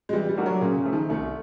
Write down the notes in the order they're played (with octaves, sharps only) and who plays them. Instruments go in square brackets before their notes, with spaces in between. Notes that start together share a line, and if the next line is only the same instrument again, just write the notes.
[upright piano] G#3
[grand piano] E3 [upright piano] G3
[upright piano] G3
[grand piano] A3 D4 F#4 A#4
[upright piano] F#3
[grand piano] A#2 [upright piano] C#3
[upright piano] C#3
[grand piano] F3 A3
[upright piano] D#3
[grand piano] C2 [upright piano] A3